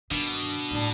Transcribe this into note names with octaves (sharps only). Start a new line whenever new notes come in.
G2 B2 D#3 D4
A2 G#3 D4